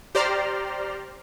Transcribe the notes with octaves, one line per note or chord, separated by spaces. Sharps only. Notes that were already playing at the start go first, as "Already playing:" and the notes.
G4 C5 D5 A#5 C6 F6